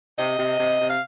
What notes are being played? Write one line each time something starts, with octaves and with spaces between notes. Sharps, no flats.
C3 D#5
C3
C3
C3
F5